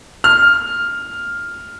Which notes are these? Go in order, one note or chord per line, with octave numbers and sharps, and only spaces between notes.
F6